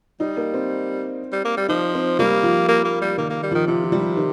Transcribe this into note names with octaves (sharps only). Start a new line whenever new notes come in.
G3 D#4
A#3
C4
G3
A#3
G3
F3 D#4
C4
G3 A#3
F3
A#3
A#3
G3
D#3 A#3
A#3
G3
D#3 F3
C3 F3
F3
G3
F3
D#3